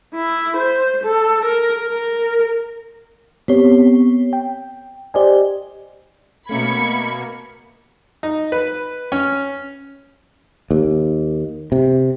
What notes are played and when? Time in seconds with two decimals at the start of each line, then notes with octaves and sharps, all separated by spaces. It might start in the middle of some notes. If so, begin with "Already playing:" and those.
0.14 E4
0.57 C5
1.04 A4
1.45 A#4
1.89 A#4
3.48 B3 C4 G4 C#5
4.33 G5
5.14 G4 C5 D5 D#5 G#5
6.49 B2 A3 A#3 C#4 E5 B5 G#6 C#7
8.23 D#4
8.52 B4
9.12 C#4
10.71 D#2
11.72 C3